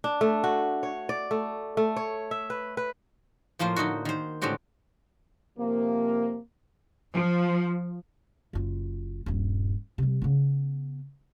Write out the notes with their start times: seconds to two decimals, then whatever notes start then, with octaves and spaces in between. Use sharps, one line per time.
0.04 D4
0.21 A3
0.44 F#4
0.83 C#5
1.09 D5
1.31 A3
1.77 A3
1.96 C#5
2.31 E5
2.50 B4
2.77 B4
3.59 A2 F3 A#3 F4 C5
3.76 D3 D#4 E4 F#4
4.05 D#3 C5
4.42 A2 D3 G#3 C4 F#4 G4
5.59 C3 F3 A#3
7.12 F3
8.53 F#1 F4
9.26 D#1 G2
9.98 C3 G3
10.22 C#3 B3